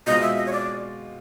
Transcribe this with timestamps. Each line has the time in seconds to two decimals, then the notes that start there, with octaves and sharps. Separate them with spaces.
0.06 B2 G#3 C4 F4 D#5
0.22 E5
0.38 D#5
0.46 C#5
0.53 D5